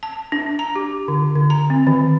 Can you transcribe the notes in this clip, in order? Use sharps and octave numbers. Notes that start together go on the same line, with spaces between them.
A5
D4
A#5
G4
D3
D3
A#5
C4
D#3